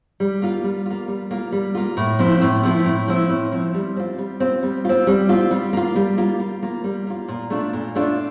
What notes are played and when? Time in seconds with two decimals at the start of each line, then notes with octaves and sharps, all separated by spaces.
0.20 G3
0.42 A#3 F4
0.64 G3
0.86 A#3 F4
1.08 G3
1.31 A#3 F4
1.52 G3
1.75 A#3 F4
1.97 A2
2.19 F3 C4 E4
2.41 A2
2.63 F3 C4 E4
2.85 A2
3.08 F3 C4 E4
3.29 A2
3.52 F3 C4 E4
3.74 G3
3.96 C4 F4
4.18 G3
4.40 C4 F4
4.63 G3
4.85 C4 F4
5.07 G3
5.29 C4 F4
5.51 G3
5.73 A#3 F4
5.96 G3
6.17 A#3 F4
6.40 G3
6.62 A#3 F4
6.84 G3
7.07 A#3 F4
7.28 A#2
7.50 A3 D4 F4
7.73 A#2
7.95 A3 D4 F4